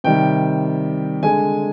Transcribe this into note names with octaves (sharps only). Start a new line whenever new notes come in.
C3 D#3 G3 G5
D3 G#3 G#5